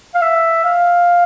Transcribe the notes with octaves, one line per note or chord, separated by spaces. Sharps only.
F5
E5
F5